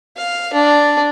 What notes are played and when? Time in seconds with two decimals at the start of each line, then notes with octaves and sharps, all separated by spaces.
0.17 F5
0.54 D4